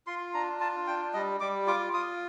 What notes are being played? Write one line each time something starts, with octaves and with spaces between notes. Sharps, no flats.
F4 C6
D4 A#5
F4 A5
D4 G5
G3 D#5
G3 D6
F4 D6
F4 D#6